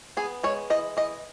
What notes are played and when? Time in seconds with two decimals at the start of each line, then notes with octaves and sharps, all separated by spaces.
0.17 B3 G#4
0.43 G#3 C#5
0.70 E3 D#5
0.97 E3 D#5